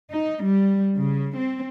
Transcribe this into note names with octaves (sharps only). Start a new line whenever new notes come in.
D#4
G3
C#3
C4